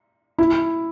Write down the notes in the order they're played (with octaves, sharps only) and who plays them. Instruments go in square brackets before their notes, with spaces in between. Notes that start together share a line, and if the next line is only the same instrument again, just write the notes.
[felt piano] E4